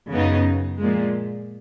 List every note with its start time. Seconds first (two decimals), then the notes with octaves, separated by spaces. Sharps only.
0.13 F#2 C#3 F#3 B3 D#4
0.79 A#2 F3 G#3